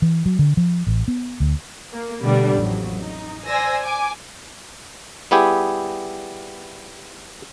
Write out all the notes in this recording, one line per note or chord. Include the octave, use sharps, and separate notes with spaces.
E3
F#3
D3
F3
A1
B3
D2
A#3
B2 D3 G3 A3 B3 D4
A1 F2 F#3
D#4
C5 D5 G#5 E6 A#6
G#5 D6
G3 B3 E4 G4 G#4